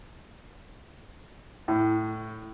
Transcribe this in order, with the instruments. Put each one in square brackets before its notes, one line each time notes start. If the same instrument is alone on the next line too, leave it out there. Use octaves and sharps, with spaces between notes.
[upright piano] A2